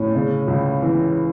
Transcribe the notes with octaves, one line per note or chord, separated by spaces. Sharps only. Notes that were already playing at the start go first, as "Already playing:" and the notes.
Already playing: A2 C#4
C#3
C#2
E3